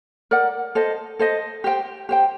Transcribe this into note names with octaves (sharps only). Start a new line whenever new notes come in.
A#4 D5 F#5
A4 C5 D#5
A4 C5 D#5
G4 C5 G5
G4 C5 G5